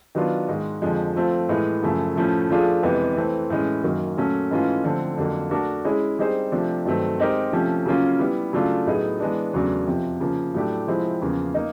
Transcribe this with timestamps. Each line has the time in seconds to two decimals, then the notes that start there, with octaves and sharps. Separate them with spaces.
0.15 D#3 F#3 B3 D4 F4
0.48 G#2 D#3 G#3
0.82 F2 D3 F3 G#3
1.16 F3 A3 C4 F4
1.49 A2 E3 G#3
1.83 F#2 C#3 F3 A3
2.16 A2 F3 A3 C#4
2.50 F3 A3 D4 F4 G#4
2.83 F2 C3 E3 G#3 B3
3.17 E3 A3 C4
3.50 A2 E3 G#3 C#4
3.84 F#2 D#3 F#3 A#3
4.17 A#2 F#3 A3 C#4
4.51 G#2 E3 A3 C#4 F4
4.84 D3 F3 A3 C4
5.17 F2 D3 F#3 A#3
5.51 A3 D4 F#4 A#4
5.85 G#3 C#4 E4 G#4 C#5
6.19 G3 C4 D#4 G#4 C5
6.52 C3 F3 A3 D4
6.85 G2 D#3 F#3 A3 C4
7.19 G#3 C4 D#4 G4 A#4
7.53 C3 F3 A3 C#4
7.86 C#3 F#3 A#3 C#4 F4
8.19 G3 B3 E4
8.53 C#3 F#3 A3 D4 F4
8.87 A2 F#3 B3 D#4 G#4
9.20 E3 G#3 B3 D4
9.54 E2 C#3 F#3 A3 D4
9.87 F2 C3 F3
10.20 C#3 F3 A#3
10.54 A2 F#3 A3 D4 G4
10.88 C3 F3 G#3 C4 E4
11.21 E2 C#3 F3 A#3
11.54 A#3 D#4